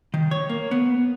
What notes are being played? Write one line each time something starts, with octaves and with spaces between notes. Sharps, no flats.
D#3
C#5
A#3
B3